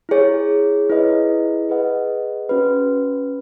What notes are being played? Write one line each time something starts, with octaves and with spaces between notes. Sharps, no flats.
E4 G#4 C#5
E4 G#4 B4 D#5
G#4 B4 D#5 F#5
C#4 F#4 B4